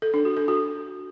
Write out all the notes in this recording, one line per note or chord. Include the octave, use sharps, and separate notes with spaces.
A4
D4
F#4
A4
F#4